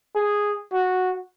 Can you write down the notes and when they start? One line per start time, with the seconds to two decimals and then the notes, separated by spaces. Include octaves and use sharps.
0.15 G#4
0.73 F#4